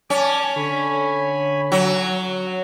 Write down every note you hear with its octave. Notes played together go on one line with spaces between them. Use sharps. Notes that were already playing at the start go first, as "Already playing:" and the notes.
C#4 D5 G#5 A5 D6
D3 C#5 G#5 B5
F#3 F#5